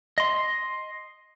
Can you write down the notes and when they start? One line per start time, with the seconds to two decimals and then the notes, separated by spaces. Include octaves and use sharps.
0.18 D#5 C6